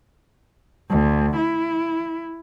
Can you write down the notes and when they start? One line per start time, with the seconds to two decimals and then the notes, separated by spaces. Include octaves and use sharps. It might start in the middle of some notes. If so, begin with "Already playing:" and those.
0.90 D2
1.36 E4